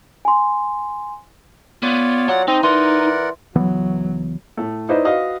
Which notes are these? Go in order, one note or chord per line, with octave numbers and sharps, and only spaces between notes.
G#5 C6
B3 F4 C#5 D5
F#3 F#5
C4 D#4 D#5
E3 D#4 A#4 D5 F#5 C6
C#2 E3 F#3 B3
A2 A3
D#4 E4 B4 C5 D5 D#5
F#4 B4 D#5 F5